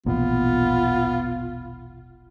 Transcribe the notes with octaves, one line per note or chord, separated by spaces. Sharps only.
E1 A#1 A#3 B3 F4